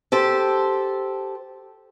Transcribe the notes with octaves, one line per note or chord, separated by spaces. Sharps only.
G4 A4 C5